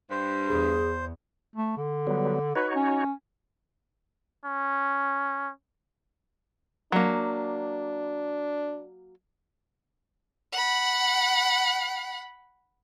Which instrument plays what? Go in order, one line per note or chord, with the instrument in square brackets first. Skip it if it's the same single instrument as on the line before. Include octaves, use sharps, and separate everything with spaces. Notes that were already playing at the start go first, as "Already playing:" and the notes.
[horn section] G2 [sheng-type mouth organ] C5
[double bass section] E2 [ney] G#4
[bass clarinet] A3
D3
[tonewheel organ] F#3 G3 B3
[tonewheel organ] D#4 F#4 C#5 [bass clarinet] B4
[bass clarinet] C#4
[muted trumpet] C#4
[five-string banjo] F#3 A#3 [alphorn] D4
[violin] F#5 B5